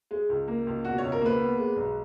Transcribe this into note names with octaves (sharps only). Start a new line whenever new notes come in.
G#3
C#2
A#3
C#2
B2 F#4
C#5
C#2
A#4
A#3 B4
B3
G#3
B1